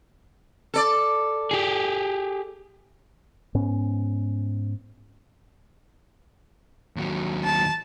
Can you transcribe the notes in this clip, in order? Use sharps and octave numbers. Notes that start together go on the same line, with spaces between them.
A4 D5
G4 G#4
G#2 B3 C#4
D#2 F#3
A5